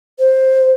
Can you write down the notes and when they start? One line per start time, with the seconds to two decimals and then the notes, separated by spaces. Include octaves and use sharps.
0.19 C5